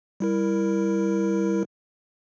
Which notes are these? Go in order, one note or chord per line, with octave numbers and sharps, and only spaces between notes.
G3 E4 A#4